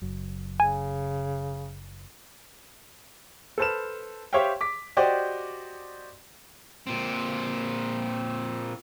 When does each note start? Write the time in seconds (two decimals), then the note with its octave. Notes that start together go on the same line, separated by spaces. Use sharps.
0.02 F#1 F#3
0.60 C#3 G#5
3.58 A4 B4 C5 A5 F6 E7
4.33 G4 C5 C#5 E5 F5 G5
4.61 D6 B6
4.97 F#4 G4 C5 D5 D#5 G5
6.87 A#2 C4